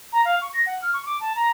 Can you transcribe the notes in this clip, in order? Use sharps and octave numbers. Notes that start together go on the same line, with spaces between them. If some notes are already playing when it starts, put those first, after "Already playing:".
A#5
F5
C#6
A#6
F#5
F6
C#6
D6
A5
A#5